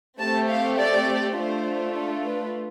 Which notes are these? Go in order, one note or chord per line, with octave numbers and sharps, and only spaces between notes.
A3 C4 G4 A5
F5
D5
A3 D4 F4 C5
A4
B4